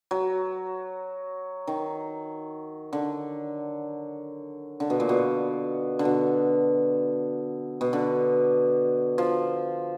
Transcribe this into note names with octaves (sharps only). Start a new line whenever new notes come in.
F#3
D#3
D3
D3
B2
A#2
B2
D3
B2
B2
D3
F3